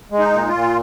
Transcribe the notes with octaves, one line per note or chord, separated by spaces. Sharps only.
G#3
D#4
A#2
F4
A#2